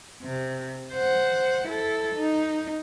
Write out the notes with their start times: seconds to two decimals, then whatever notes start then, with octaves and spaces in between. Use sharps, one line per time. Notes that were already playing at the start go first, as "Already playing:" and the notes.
0.22 C3
0.93 C5 F#5
1.68 E4 A4
2.16 D#4